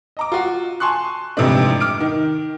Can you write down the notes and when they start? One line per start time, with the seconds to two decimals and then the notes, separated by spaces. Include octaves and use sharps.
0.17 D#5 A#5 D6
0.32 F4 F#4
0.80 G#5 A5 C6 C#6 F#6
1.37 F2 G#2 C3 E3 A3 D4
1.80 D6 F6 D7
2.00 D#3